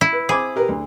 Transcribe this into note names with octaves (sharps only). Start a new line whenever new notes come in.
E4
B4
C4 G#4 B5 D6
G4 A#4 B4
D2